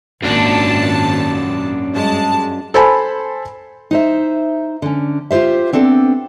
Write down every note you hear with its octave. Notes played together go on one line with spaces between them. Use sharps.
G#1 F#2 A#2 D4 A5
G2 G#3 A5
A4 C5 G#5 A5 B5
D#4 C5 E5
D3 C#4
F4 G4 A4 C5 E5
B3 C4 D4 A4